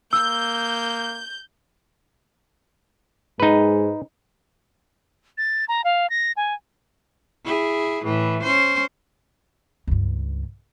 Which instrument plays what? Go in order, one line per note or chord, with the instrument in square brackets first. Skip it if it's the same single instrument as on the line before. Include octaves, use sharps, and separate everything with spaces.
[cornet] A#3 [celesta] E6 [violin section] G6
[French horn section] G#2 G#3 [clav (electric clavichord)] D#4 B4
[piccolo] A6
A#5
F5
A#6
G#5
[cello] E4 G#4
A2 E3
C#4 C5
[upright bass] C#2 G2